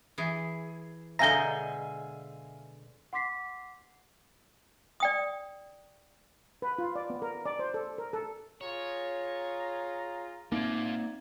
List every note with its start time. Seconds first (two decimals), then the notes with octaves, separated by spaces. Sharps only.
0.18 E3 G#4
1.19 B2 D3 G#3 E5 F5 G#5 A#5 G6
3.13 F#5 C6 D6 B6 C7
5.00 D5 G5 D#6
6.62 B4
6.78 F4
6.95 D5
7.10 B3
7.22 A#4
7.46 D5
7.59 C5
7.74 A4
7.98 A#4
8.13 A4
8.61 F4 G#4 C#5 A#5
10.52 A#3 C4 D#4 F4 D5 E5 G#6